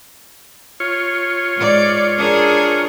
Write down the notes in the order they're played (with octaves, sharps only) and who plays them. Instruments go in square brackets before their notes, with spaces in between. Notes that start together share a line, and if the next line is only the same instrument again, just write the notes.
[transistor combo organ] F4 C#5
[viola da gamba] G#2 D5
D4 G#4 A#4